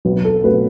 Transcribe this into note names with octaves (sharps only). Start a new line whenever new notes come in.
B1 B4
A4
B2 F#3 A3 B4